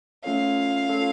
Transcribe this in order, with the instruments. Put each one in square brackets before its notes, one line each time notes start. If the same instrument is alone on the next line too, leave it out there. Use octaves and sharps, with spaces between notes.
[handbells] A3 C#4 F4 A4 C#5 [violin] F5
[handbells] A3 C#4 F4 A4 C#5